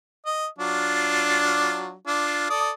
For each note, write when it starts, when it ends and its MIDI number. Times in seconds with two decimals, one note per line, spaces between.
0.26 0.46 75
0.59 1.94 54
0.59 1.94 62
0.59 1.94 65
2.07 2.47 62
2.07 2.47 65
2.50 2.71 69
2.50 2.71 74
2.50 2.71 87